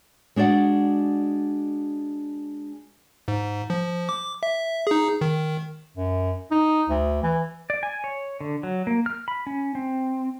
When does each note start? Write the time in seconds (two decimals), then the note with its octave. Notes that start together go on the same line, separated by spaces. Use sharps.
0.36 G#3 D4 F#4 D5 F#5
3.28 G#2
3.70 F3
4.09 D6
4.43 E5
4.87 D#4 G#4
5.21 D#3
5.97 F#2
6.51 D#4
6.89 D2
7.23 E3
7.70 D5
7.83 G#5
8.04 C#5
8.41 D3
8.63 F#3
8.87 A#3
9.06 F6
9.28 B5
9.47 C#4
9.75 C4